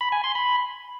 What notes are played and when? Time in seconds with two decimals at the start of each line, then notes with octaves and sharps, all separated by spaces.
0.01 B5
0.12 G#5
0.24 C6
0.35 B5